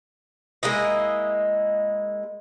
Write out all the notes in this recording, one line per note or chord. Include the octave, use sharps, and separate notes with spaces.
G#3 A#3 E4 D#5